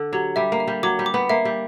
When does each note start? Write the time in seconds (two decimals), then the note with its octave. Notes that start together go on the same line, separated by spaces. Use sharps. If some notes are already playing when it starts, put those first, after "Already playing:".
Already playing: D3
0.13 F#3 G4
0.36 G3 E5
0.52 A#3
0.60 E5
0.68 G3
0.83 F#3 D6
0.99 G3
1.06 D6
1.14 B3
1.29 A#3 E5
1.45 G3